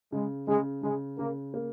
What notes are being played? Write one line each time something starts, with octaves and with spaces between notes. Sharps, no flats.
C#3 G#3
C#3 G#3
C#3 G#3
C#3 A#3
A#3